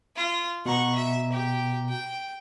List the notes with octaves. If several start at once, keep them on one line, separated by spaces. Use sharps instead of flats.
F4
B2 F#5 A#5 C#6
E5
G4 G5
G5